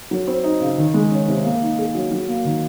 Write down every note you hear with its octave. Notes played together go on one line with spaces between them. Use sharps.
F#3
C4
D#4
C#3
D#3
G#3
C#4
C3
A#3
D#4
G#4
F#3
F#3
A#3
D#3